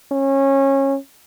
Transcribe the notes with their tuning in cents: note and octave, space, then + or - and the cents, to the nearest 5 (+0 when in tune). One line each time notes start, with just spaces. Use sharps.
C#4 -20